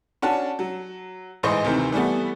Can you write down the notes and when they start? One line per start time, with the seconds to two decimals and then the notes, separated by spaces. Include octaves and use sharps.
0.22 C#4 D4 F#4 F#5 A5
0.59 F#3
1.43 A1 G#2 E3 C5 D#5 C#6
1.64 D2 C3 D#3 E3 C4
1.92 E3 G3 A3 B3